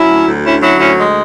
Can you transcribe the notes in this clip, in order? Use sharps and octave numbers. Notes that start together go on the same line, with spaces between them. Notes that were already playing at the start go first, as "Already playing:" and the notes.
Already playing: F#3 C#4 E4
D2
D2
D3 C#4 E4
F#3 C#4 E4
D2 C#4 E4
G#3